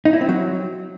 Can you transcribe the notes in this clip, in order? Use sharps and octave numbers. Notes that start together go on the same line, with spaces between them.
D#4
E4
C4
F#3